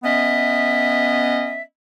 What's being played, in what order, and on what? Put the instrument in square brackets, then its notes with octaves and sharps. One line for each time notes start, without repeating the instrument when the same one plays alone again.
[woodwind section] B3 C#4 D#5 E5